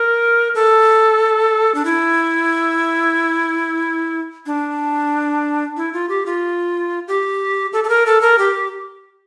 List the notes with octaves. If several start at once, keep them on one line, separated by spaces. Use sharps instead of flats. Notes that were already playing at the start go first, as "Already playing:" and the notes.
Already playing: A#4
A4
D4
E4
D4
E4
F4
G4
F4
G4
A4
A4
A#4
A4
A#4
G4